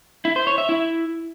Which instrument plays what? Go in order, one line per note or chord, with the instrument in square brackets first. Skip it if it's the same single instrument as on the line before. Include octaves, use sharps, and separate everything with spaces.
[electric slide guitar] E4
C5
C#5
E5
E4